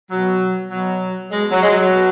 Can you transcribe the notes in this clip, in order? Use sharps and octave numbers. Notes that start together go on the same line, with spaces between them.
B2 F#3
B2 F#3
B2 G#3
F#3
G#3
F#3
B2